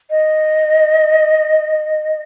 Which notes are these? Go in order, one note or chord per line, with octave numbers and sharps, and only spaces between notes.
D#5